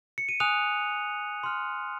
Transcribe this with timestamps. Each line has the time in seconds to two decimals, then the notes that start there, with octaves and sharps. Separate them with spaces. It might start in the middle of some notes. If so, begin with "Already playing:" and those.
0.18 C#7
0.29 D#7
0.40 G#5 D#6 F#6 F7
1.43 C6 F6